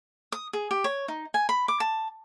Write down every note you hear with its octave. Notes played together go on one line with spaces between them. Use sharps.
D#6
G#4
G4
C#5
D#4
G#5
B5
D6
A5